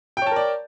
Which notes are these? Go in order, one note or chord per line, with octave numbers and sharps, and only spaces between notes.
A#4 C#5 D5 G5 A5